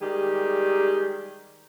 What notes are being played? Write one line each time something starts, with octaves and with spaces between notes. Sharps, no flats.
D#3 G3 G#3 G4 G#4